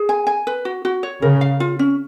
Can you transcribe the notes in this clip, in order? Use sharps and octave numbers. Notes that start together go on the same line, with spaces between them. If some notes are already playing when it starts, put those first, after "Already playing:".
Already playing: G#4
G#5
G#5
B4
F#4
F#4
C#5
C#3 A#4
F5
F4
C#4